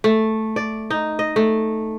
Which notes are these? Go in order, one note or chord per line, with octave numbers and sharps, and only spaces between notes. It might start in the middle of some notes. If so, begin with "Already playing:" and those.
A3
D5
D#4
D#5
A3